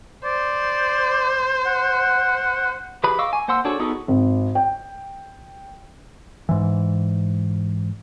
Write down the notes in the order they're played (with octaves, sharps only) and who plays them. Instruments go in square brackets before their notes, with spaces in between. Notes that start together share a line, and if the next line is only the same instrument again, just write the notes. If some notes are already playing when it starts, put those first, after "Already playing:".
[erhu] C5 [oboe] D5
[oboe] F#5
[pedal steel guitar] E3 G4 G#4 B4 B5
D#5 F5 C#6 D6 E6
G#5
A#3 C5 F#5 C6 E6
D4 F#4 G#4 A4 C#5
B3 D#4 F#4 G#4 A4
[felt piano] G#1
G5
[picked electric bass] G#2 E3